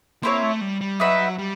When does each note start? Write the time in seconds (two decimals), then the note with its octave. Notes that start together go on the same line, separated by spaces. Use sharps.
0.23 A#3 C4 E4 A4 C#5
0.43 A3
0.61 G3
0.81 G3
1.00 F#3 D#4 F#4 B4 E5
1.38 G3